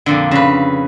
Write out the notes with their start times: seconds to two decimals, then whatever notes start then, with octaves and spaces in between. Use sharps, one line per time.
0.06 F2 A#2 D3
0.31 C#3 B4